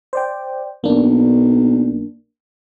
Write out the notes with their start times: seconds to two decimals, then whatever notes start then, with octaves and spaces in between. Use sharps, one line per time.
0.13 C5 D5 G5
0.84 B1 A#3 D4